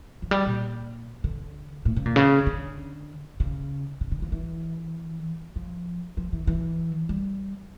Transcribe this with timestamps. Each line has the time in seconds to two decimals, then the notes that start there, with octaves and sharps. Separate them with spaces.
0.22 F3
0.31 G3
0.46 A#2
1.24 D3
1.85 A2
1.96 C#3
2.06 A#2
2.16 C#3
2.47 D3
3.40 C#3
4.01 C#3
4.12 D3
4.22 F3
4.32 E3
5.56 F3
6.17 F3
6.33 E3
6.47 E3
7.09 G3